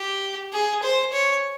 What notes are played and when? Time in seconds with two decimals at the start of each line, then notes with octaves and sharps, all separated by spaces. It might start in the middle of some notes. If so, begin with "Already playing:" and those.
Already playing: G4
0.53 G#4
0.83 C5
1.13 C#5